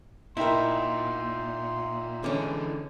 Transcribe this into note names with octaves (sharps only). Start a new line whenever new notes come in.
A#2 D#4 E4 A#4 E5 G5 C6
D3 E3 G#3 C#4